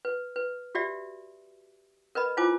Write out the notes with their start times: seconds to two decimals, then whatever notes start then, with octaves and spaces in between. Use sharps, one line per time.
0.05 B4
0.36 B4
0.75 F#4 G4 D5 E5
2.15 A#4 B4 D#5 B5
2.37 E4 F4 C5 G#5 D6